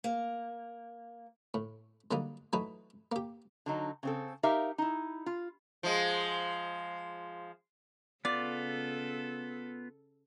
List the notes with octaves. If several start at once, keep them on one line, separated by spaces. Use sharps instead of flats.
A#3
A2
D3 F#3 G3 A#3 D#4
E3 F#3 A3 D#4 B4
A#3 G4
D3 F#3 D#4
C#3 C4 A4
D#4 G4 A#4 E5 F5
D#4 E4
F4
F3 G#3
C#3 B3 F4 A4 D5